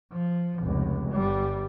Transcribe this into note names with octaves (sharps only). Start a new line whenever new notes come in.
F3
F1 C#2
G1 G3